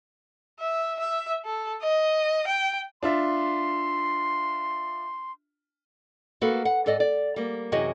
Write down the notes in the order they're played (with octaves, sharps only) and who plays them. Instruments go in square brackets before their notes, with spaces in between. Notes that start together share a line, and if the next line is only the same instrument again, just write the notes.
[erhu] E5
E5
A4
D#5
G5
[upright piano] D4 F4 E5 [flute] C6
[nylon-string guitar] A#3 F#4 A4 B4
F#5
G#2 A4 D5 D#5
D5
G3 A#3
F#2 C3 E3 F#4 G#4 D#5